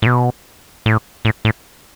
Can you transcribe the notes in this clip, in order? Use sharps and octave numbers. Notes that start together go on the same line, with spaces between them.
A2
B2
A2
A2
A2